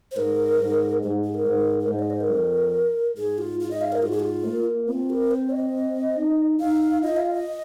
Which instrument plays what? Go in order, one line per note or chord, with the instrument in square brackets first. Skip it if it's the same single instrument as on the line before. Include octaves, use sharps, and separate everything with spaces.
[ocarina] C5
[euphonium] G#2 [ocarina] A#4
[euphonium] G#2
[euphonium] G#2 [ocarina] G#4
[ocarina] G#4
A#4
[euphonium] G#2
[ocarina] A#4
[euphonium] G#2 [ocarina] C5
[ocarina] D#5
C5
A#4
[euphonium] F2
[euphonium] G#2 [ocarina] G#4
[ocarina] F4
F4
D#5
F5
A#4
[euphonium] G#2 [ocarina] F4
[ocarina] G#4
F4
[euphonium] A#3
[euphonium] C4 [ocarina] F4
[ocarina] A#4
C5
D#5
[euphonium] D#4
[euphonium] D#4 [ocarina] F5
[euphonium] F4 [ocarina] D#5
[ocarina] F5
D#5